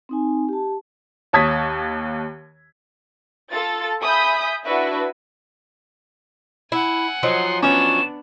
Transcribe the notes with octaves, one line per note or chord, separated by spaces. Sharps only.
C4 D#4 G#5
G4 A5
D#2 C#5 A5 D#6 G#6 B6
F4 A4 A6
E5 G#5 B5 D#6 G6 B6
D4 E4 F#4 B4 E5
E4 F#5 G#5
F3 F#3 D#4 C6
B3 C#4 D4 E7